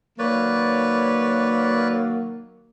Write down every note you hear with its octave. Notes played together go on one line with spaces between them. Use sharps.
D#3 F#3 A#3 B4 C#5 D5